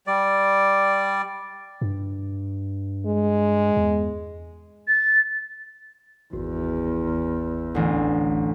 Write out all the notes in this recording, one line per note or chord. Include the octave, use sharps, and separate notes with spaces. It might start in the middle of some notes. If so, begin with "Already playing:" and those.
G3 D5
G2
G#3
E2
A6
G#1 E2
A1 D2